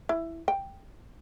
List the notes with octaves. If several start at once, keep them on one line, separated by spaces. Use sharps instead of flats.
E4
G5